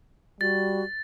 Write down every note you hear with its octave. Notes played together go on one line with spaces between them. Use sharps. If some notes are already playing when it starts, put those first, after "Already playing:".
G3 F#4 A6